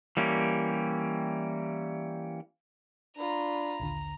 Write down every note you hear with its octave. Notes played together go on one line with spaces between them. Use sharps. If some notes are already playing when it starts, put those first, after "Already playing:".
E3 G3 A#3 C#4 G4
D4 F4 A#5 B5
A#1 D#2 D3